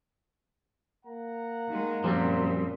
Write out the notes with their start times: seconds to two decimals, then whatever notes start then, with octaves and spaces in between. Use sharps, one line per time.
1.05 A#3 F#5 A#5
1.68 D#3 G#3
2.04 F#2 A#2 F3 G3 C4